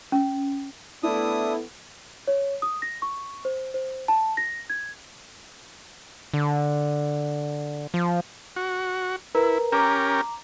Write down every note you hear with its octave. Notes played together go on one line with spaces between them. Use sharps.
C#4
A3 B3 D4 E4 A4 D#6
C#5
D#6
A#6
C#6
C5
C5
A5
A#6
G#6
D3
F3
F#4
E4 A#4 B4 A#5
C#4 G4 A#4 A#5 D6